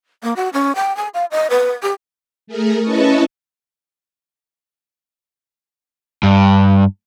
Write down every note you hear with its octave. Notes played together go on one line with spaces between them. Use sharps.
A#3
F#4
C#4
G5
G#5
F5
D#5
B4
G4
A3 G#4 A#4
C#4 E4 B4 D#5 A5 C#6
G2